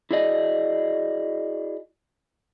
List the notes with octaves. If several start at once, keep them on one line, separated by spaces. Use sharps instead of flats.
E4 F#4 G#4 D5 D#5